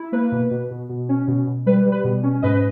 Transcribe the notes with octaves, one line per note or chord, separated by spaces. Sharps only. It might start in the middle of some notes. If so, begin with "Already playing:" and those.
Already playing: E4
A#3 B4
B2
B2
B2
B2
C#4
B2
B2
G3 B4
G3
B4
B2
C#4
G#2 B4 D#5